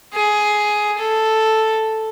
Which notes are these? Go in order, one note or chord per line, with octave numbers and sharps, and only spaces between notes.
G#4
A4